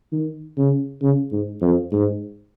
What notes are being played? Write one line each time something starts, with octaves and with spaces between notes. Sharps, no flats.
D#3
C#3
C#3
G#2
F2
G#2